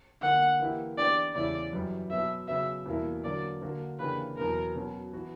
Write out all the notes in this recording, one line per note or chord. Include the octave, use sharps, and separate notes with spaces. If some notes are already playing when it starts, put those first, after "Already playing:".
D3 A#3 D4 F#5
E3 A#3 E4 G4
E3 B3 D4 G4 D5
E2 C#3 G3 C#4 E4 D5
F#2 E3 G3
B2 F#3 B3 E5
C#3 F#3 B3 E5
E2 B2 G3 A#3 E4
D3 F#3 A#3 D5
D3 A#3 D4 F#4
C#3 E3 A#3 D4 G4 B4
E2 B2 F#3 B3 A#4
B2 F#3 C#4 F#4
E3 B3 F#4